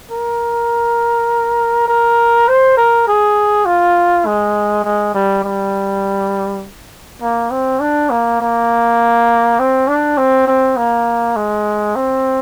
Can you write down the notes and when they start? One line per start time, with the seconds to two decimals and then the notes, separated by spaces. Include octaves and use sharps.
0.11 A#4
1.88 A#4
2.48 C5
2.77 A#4
3.08 G#4
3.66 F4
4.26 G#3
4.85 G#3
5.14 G3
5.44 G3
7.22 A#3
7.51 C4
7.80 D4
8.10 A#3
8.41 A#3
9.59 C4
9.88 D4
10.18 C4
10.47 C4
10.77 A#3
11.36 G#3
11.96 C4